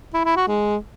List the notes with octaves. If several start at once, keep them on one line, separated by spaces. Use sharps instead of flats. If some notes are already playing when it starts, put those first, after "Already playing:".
E4
E4
F#4
G#3